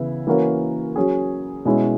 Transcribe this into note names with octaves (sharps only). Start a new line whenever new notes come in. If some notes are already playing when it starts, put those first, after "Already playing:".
Already playing: C#3 E3 B3 E4
E3 A#3 C#4 F#4 A#4
F#3 C#4 G#4
B2 G#3 C#4 E4